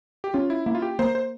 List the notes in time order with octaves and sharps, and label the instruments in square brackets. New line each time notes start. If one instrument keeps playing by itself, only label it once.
[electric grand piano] G4
[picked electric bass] C#4 [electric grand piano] F4
[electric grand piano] E4
[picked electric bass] A#3 [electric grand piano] E4
[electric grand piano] F4
G4
[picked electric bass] A#3 [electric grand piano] C5
[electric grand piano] C5